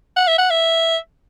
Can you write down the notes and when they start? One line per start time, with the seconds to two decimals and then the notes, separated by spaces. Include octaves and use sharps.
0.17 F#5
0.27 E5
0.38 F#5
0.50 E5